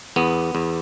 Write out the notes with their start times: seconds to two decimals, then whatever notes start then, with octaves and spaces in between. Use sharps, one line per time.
0.16 E2 B3
0.55 E2